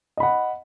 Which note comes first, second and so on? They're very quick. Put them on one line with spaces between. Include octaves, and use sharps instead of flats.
D#5 B5 F#5